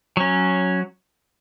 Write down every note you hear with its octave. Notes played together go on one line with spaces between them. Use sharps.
F#3 C#4